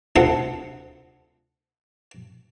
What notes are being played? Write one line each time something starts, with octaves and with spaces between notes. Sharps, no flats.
D2 C3 F3 A4 F#5 C6